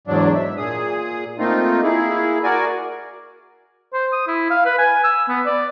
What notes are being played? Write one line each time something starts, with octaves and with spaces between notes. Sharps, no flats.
E2 G#2 F#3 D4
E5
A#2 G#4 D#6
A3 A#3 C4 D#4 F4
A#3 E4 G#4
F#4 A#4 D5 G#5
C5
D#6
E4
F5
B4
G#5
E6
B3
D5